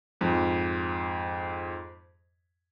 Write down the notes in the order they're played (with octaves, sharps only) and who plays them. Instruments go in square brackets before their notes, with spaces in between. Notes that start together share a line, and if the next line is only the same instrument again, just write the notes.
[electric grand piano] F2 G#2